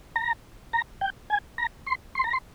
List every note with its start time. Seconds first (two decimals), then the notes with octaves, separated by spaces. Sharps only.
0.16 A#5
0.73 A#5
1.01 G5
1.30 G#5
1.58 A#5
1.86 C6
2.15 C6
2.24 A#5
2.33 C6